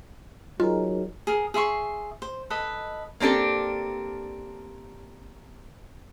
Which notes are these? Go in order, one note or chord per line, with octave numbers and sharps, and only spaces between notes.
F#3 D#4 F4 G#4 A#4
G#4 A#4
G#4 E5 C6 C#6
C5
A4 B4 D#5
A#3 C4 D4 G4 A4